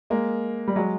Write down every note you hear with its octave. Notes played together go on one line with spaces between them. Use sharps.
G#3 A#3
G3
F#3 G#3